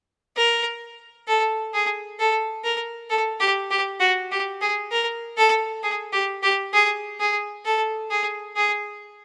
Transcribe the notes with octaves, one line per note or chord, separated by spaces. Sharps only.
A#4
A4
G#4
A4
A#4
A4
G4
G4
F#4
G4
G#4
A#4
A4
G#4
G4
G4
G#4
G#4
A4
G#4
G#4